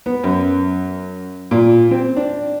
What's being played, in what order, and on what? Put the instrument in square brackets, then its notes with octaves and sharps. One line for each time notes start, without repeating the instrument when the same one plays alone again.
[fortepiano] B3
F#2
A#2
C4
D4